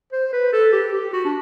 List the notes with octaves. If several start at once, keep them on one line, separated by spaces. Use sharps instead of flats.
C5
B4
A4
G4
G4
F#4
D4